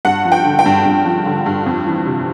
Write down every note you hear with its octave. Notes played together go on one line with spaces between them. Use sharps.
G2 F#5
F3
G5
D3
G5
G2
G2
F3
D3
G2
F2
E3
C3